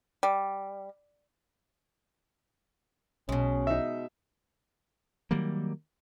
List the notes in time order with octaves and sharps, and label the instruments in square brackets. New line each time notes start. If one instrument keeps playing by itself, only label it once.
[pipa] G3
[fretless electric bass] B1 [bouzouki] B2 G#3 [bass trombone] C#4
[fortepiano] D#4 E5
[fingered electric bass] D#3 F#3 G3 A#3